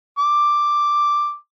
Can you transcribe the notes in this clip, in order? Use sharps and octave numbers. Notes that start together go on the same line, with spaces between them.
D6